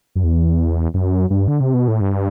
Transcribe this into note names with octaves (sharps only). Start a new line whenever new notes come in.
F#2
E2
F#2
G2
D3
C3
B2
A2
G2